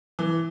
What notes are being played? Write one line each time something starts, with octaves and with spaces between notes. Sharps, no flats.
E3